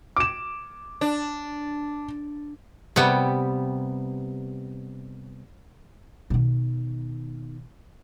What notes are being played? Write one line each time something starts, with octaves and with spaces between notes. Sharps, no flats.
D6 E7
D4
C3 G3 B3
B2 D#3